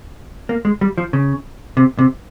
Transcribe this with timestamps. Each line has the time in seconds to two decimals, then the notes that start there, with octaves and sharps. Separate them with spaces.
0.49 A#3
0.65 G#3
0.81 G3
0.98 F3
1.13 C#3
1.77 C3
1.99 C3